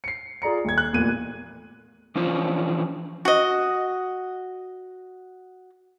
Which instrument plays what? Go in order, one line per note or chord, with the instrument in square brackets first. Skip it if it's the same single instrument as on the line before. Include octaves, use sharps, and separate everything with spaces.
[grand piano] C7 C#7
F4 G#4 D5 A#5 C#7
D#1 G#6
F#6
F1 E2 A#2 D#7
[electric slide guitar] E3 F3 C#4 D4 F4 C5
[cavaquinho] F#4 D#5